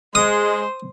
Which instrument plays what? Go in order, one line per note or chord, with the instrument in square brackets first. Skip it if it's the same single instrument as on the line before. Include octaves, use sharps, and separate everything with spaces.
[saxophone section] G#3 [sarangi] C5 [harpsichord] D#6